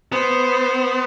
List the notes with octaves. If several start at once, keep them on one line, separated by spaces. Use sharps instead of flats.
B3 C5